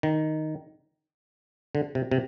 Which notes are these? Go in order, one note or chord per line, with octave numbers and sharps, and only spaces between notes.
D#3
D3
C3
C3